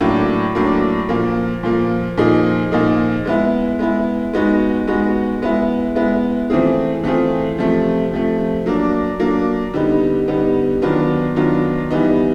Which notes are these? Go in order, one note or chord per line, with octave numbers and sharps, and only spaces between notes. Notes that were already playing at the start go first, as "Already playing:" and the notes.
A2 F#3 A#3 D4
A2 F#3 A#3 D4
A#2 F3 A#3
A#2 F3 A#3
A#2 F3 A#3 D#4 G#4
A#2 F3 A#3 D#4 G#4
G#3 B3 E4
G#3 B3 E4
G#3 B3 D#4 F#4
G#3 B3 D#4 F#4
G#3 B3 E4
G#3 B3 E4
E3 A3 C4 F4 G#4
E3 A3 C4 F4 G#4
C3 F3 A3
C3 F3 A3
F#3 A#3 D4
F#3 A#3 D4
D3 G3 B3 D#4
D3 G3 B3 D#4
D#3 F#3 B3 D4 F4
D#3 F#3 B3 D4 F4
E3 G3 B3 D#4